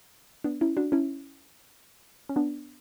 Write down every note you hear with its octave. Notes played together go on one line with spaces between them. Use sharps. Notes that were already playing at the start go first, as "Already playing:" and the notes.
B3 D4
C#4 E4
D4 F#4
C#4 E4
C#4
B3 D4